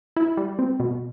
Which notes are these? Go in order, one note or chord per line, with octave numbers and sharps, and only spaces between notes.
E4
G3
C4
B2